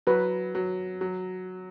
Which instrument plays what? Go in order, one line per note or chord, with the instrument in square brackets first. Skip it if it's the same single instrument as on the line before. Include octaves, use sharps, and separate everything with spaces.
[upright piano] F#3 [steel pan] B4
[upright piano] F#3
F#3